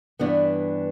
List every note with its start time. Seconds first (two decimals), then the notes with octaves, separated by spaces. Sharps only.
0.19 G2 E3 B3 D4